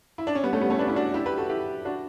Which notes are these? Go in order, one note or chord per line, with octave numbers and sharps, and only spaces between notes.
E4
D4
C#4
G3 B3
A3 C#4
G3 B3
A3 C#4
B3 D4
C#4 E4
D4 F#4
E4 G4
G4 B4
F#4 A4
E4 G4
D4 F#4